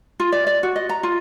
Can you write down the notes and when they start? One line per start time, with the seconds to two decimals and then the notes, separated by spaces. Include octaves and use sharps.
0.20 F4
0.32 D5
0.47 D5
0.63 F#4
0.76 D#5
0.89 A#5
1.03 F4